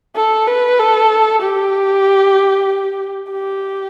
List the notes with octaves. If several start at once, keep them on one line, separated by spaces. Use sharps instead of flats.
A4
B4
A4
G4
G4